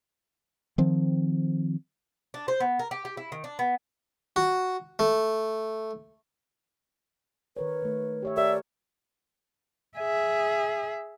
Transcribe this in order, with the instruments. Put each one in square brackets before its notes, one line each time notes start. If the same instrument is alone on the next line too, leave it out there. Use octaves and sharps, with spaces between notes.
[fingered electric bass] D#3 F3 C4
[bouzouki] D4
C5
B3
A#4
G4
G4
E4
D#3
D4
B3
[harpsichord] F#4
A3
[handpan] D#3 A#4 C#5 [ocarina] B4
[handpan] D#3 A3
G4 C#5 E5
[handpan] G4 A4 A#4 [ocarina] D5 [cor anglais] E5
[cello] G#4 E5